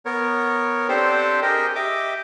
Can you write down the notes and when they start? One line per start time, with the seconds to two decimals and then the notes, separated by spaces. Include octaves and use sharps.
0.05 B3 A#4 C#5
0.89 C4 D4 G4 A4 C5
1.42 G4 G#4 A#4 D#5
1.75 G4 D#5 E5 D6